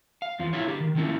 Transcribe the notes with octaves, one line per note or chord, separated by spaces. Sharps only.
F5
E2 F3
E4 F4 C#5
D3 G4
D#3
D#3 F3 A#3 C#4 E4